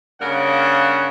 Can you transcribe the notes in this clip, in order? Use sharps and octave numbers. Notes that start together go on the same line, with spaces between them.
G2 C#3 A#3 A#4 F#5